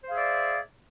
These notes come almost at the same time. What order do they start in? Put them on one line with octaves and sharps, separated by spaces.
C5 F5 G#4 E5 D5